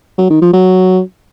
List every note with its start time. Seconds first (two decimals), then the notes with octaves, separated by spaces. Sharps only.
0.18 F#3
0.30 D#3
0.42 F3
0.53 F#3